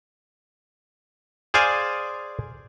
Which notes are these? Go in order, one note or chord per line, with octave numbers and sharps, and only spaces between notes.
G#4 C5 D5 F5 G#5